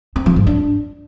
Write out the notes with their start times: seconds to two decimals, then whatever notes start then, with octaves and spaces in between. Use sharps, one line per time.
0.16 C4
0.26 F3
0.36 G#2
0.47 D4